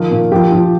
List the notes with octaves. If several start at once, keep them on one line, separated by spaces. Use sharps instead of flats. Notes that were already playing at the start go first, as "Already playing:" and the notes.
Already playing: D#3 F3 A#4
A#2
F3 G4
F3